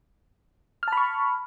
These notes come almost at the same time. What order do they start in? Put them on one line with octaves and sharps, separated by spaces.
F6 A5 B5 C#6